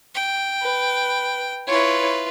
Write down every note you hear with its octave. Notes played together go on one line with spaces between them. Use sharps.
G5
B4
E4 F4 B4 C#5